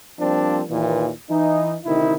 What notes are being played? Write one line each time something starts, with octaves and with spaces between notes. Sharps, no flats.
F3 G3 A#3 C4 D4
D#2 A#2 E3
E3 D#4
D2 C3 D#3 D#4 E4